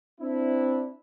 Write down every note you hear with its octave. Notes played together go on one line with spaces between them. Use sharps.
C4 D4 E4